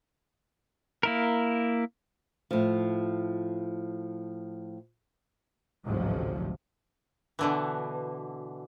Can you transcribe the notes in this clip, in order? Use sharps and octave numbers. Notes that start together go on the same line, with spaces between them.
A#3 E4 A#4
A2 F3
A1 D2 G#2 C3 F3 F#3
B2 D3 E3